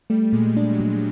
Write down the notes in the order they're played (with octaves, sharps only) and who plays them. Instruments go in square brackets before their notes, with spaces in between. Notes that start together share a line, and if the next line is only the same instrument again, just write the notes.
[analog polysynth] G3 [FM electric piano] A3
[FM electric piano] A#2 [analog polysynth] G#3
[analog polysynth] G3
[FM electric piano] D4
[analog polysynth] F#3
[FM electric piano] A#2